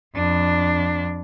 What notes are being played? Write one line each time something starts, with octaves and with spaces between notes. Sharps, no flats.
F2 D4